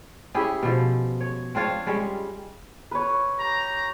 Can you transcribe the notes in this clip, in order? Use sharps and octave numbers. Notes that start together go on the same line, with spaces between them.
C#4 E4 G4 G#4
B2 F3
C#5
C4 D4 F4 C#5
G3 G#3 C#4
B4 C#5
G4 A#5